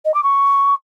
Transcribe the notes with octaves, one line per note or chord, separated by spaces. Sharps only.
D#5
D6
C#6